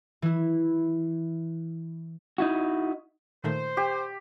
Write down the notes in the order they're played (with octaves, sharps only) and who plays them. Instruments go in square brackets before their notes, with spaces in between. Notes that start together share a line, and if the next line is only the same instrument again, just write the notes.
[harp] E3 E4
[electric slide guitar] D#4 E4 F#4
[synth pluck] A#2 D#3 A3 [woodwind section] C5
[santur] G4